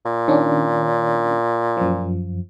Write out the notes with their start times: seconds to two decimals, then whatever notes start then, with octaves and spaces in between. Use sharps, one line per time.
0.05 A#2
0.28 D#3 C#4 D4
1.77 F#2 F3